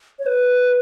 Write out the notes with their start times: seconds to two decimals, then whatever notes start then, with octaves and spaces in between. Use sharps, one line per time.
0.19 C#5
0.26 B4